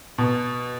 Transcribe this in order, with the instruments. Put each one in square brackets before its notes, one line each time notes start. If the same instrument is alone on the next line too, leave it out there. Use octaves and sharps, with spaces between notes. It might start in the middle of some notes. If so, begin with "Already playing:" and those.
[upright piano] B2